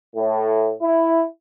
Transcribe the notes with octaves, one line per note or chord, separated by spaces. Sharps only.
A2
E4